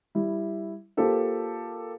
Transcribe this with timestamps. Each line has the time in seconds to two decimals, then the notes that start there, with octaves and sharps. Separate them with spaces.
0.15 G3 E4
0.97 A#3 F4 G4 A4 C5